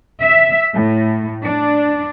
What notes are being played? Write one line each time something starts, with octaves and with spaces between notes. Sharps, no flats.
E5
A2
D4